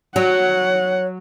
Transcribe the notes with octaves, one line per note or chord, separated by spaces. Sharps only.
F#3 C#5 F#5